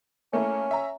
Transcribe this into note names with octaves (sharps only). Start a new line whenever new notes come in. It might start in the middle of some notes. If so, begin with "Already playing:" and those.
A3 A#3 C#4 E4
E5 A#5